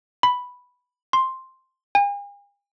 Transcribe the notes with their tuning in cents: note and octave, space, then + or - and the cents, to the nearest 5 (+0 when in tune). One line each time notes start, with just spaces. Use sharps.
B5 +0
C6 +5
G#5 -45